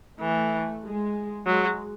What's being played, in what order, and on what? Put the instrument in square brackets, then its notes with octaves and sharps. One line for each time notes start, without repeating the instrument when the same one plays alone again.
[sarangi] E3 [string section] A3
[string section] G#3
[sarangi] F#3 [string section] G#3